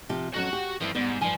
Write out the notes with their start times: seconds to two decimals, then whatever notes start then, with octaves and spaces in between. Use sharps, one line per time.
0.09 C3 F3 G4
0.34 F2 F#3 C#4 F#4 F#5
0.53 G4
0.81 G2 F3 C4 E4
0.95 G#2 G3 B3
1.21 G2 F3 G#5